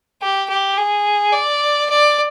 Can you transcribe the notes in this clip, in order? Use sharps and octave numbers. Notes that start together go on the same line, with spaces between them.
G4
G4
G#4
D5
D5